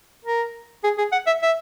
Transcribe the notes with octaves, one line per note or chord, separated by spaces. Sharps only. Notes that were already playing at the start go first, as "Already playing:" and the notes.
A#4
G#4
G#4
F#5
E5
E5